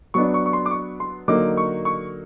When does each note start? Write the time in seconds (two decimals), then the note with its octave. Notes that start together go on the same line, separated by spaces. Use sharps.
0.14 F#3 B3 D4 C#6
0.34 C#6
0.46 C#6
0.53 C6
0.66 D6
0.71 C#6
1.00 C6
1.28 D3 F#3 A#3 D#4 D6
1.57 C#6
1.85 C#6